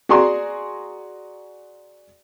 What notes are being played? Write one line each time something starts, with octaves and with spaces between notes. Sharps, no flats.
F#4 G#4 D5 A#5 C6